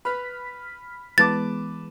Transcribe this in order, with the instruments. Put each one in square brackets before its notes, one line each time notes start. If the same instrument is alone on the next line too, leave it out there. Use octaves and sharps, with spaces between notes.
[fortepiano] B4 [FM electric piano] B5 F6 B6
[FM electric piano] E3 G#3 B3 [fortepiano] B4 A5 D6 [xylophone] A6